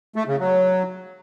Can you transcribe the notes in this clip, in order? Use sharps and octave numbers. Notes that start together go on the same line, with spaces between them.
A3
C#3
F#3